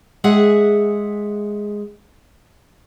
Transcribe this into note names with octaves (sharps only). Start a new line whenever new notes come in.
G#3 G#4 E5 F#5